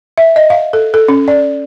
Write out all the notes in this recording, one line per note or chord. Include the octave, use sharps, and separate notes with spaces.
E5
D#5
F5
A4
A4
C#4
D5